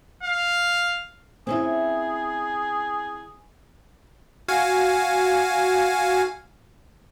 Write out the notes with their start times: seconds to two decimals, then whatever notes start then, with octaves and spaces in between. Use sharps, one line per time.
0.23 F5
1.47 C4 C#4 E4 G#4
4.48 F#4 F5 G#5